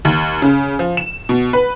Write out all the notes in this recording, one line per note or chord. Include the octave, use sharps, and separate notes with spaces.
D#2
C#3
F3
E7
B2
B4